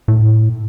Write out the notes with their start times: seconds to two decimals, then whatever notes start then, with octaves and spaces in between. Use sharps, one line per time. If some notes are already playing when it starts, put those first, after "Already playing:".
0.08 A2